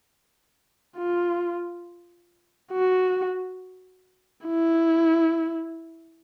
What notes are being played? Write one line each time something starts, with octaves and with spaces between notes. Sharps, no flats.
F4
F#4
E4